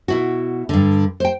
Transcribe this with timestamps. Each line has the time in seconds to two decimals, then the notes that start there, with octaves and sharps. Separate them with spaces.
0.08 B2 E4 F#4
0.69 G2 D3
1.20 C5 G5